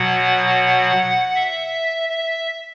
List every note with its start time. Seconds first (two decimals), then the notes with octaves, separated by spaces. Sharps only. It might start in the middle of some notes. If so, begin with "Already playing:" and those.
Already playing: B2 F#3 F#5
1.35 E5
2.09 E5